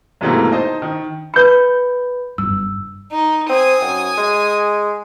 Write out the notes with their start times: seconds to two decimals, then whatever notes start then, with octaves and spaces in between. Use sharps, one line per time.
0.21 B1 G#2 C3 E3 A3 A#3
0.52 D#4 C5 D#5 A5
0.82 D#3
1.34 B4 B5 G6 C#7
2.38 F#1 G2 E6
3.12 D#4
3.50 C4 G#5 D#6
3.82 F#2
4.18 G#3